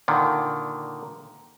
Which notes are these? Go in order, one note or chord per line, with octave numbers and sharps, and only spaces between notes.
A#2 D3 D#3